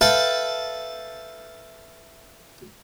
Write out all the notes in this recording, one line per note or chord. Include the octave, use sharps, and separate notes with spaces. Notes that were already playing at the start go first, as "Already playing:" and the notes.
A4 B4 E5 F5 G5 A5